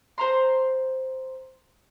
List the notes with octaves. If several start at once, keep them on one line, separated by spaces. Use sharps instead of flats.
C5 A#5 C6